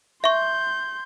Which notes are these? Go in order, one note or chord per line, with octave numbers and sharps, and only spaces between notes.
E5 C6 C#6 G6